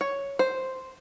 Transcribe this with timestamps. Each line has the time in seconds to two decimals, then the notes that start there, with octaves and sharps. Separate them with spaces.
0.01 C#5
0.39 C5